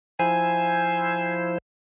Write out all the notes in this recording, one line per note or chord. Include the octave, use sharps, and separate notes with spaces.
F3 E4 C5 G#5